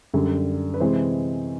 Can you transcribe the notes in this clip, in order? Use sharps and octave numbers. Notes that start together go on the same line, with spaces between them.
F#2 D3 G3
B4
C3 E3 G#3 C5